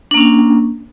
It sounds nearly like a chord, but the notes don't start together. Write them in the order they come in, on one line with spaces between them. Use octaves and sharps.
D4 A#3 C#4